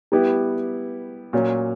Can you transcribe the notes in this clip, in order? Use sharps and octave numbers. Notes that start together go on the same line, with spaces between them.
G3 B3 E4 G4
A#2 F#3 C#4